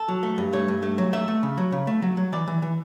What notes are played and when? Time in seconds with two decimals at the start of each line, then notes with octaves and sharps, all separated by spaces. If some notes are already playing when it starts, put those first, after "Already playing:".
Already playing: A4
0.08 F#3
0.23 A3
0.38 G2
0.53 A3 C#5
0.68 G2
0.83 A3
0.98 F#3
1.13 A3 E5
1.28 A3
1.43 C#3
1.57 F#3
1.72 C#3
1.87 A3
2.02 F#3
2.17 F#3
2.32 E3 D5
2.48 E3
2.62 E3